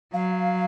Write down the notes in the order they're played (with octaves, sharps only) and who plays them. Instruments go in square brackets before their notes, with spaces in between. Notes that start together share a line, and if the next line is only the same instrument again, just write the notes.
[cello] F#3 [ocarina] F5